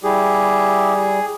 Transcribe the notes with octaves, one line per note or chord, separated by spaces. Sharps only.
G3 E4 G4 G#4